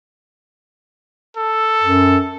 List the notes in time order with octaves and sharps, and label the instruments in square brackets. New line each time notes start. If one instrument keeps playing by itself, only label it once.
[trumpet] A4
[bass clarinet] F#2